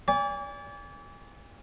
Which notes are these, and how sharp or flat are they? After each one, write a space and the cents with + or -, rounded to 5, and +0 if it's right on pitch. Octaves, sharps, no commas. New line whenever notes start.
D5 -35 G#5 -35